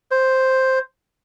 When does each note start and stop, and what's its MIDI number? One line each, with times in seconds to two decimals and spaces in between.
0.11 0.79 72